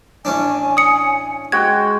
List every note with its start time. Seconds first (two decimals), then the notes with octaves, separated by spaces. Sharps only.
0.25 A1 C#4 D4 G#5
0.77 D#6 C#7
1.52 G#3 F#4 G5 G#6